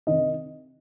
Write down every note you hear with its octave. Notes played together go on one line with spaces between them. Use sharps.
C3 D#3 D#5